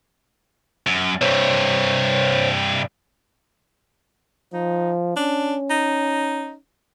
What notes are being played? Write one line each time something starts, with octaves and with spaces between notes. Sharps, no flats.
F#2
G2 C3 C5 C#5
F3 D#4
C#4 D4
D#4